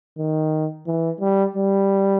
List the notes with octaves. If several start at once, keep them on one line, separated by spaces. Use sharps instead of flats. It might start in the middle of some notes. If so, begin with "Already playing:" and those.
D#3
E3
G3
G3